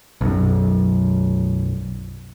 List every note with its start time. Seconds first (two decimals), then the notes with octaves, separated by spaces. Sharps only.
0.21 B1 F#2